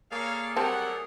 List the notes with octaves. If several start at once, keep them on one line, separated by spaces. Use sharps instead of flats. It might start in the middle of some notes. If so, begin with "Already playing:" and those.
A#3 G#4 A4 C#5 D5 F5
F#3 G3 A3 C4 A#4 F#5 A5